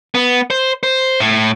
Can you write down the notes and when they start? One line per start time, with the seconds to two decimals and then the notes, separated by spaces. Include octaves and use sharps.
0.15 B3
0.50 C5
0.83 C5
1.20 A2